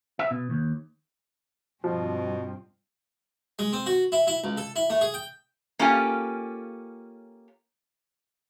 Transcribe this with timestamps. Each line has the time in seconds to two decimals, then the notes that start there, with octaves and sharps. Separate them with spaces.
0.19 E5
0.31 B2
0.50 D#2
1.84 G2 B2 F3 C4
3.59 G#3
3.73 C4
3.86 F#4
4.12 E4
4.27 E4
4.44 C#2
4.58 A4
4.76 E4
4.90 A3
5.01 G#4
5.14 G5
5.79 A#3 C#4 F4 G4 A4 G#5